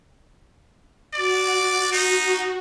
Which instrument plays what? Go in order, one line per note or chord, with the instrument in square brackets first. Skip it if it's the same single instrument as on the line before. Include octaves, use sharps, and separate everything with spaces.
[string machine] F#4 [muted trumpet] D5
[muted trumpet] D#4